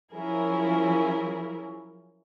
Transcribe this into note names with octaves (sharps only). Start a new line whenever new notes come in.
F3 F#3 C#4 E4 G#4 A#4